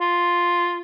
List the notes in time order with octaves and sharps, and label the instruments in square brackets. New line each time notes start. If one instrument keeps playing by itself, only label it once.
[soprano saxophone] F4